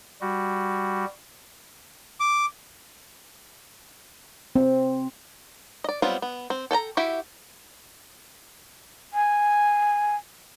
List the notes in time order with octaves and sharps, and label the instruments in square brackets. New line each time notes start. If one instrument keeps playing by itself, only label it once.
[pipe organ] G3 F#4
[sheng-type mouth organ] D6
[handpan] C4
[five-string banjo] D5 D#5
F#3 G3 B3 C4 F4
B3
C4
A4 G5 A5 A#5
E4 F#4 G4 E5 G5
[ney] G#5